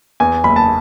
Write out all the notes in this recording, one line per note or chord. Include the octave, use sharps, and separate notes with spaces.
E2 G#5
F#1 B5
A5